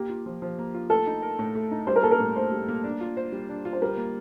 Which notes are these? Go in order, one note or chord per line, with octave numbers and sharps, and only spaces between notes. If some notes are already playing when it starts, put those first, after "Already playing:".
Already playing: A#3 G4
F4
F3
F3
A#3
F4
A3 A4
D#4
A#4
A2
A3
D#4
G3 C5
A#4
A#3 A4
A#4
A2
A2 C5
G3
A#3
D4
F4
C5
G3
D4
F4
C5
G3 A#4
A#3